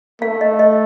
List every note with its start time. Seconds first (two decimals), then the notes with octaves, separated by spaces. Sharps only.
0.22 A3 F5
0.41 D#5
0.59 D#5